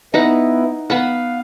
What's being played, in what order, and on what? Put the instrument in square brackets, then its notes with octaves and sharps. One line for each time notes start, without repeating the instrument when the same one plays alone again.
[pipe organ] B3 E4 [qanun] D#4 B4 F#5
[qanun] B3 B4 F#5 [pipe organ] F5